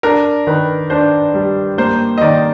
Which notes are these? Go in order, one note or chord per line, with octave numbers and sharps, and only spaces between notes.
D4 A#4
D#3 B4
D4 C5
G3
A#3 C5
D#5
D#3 D5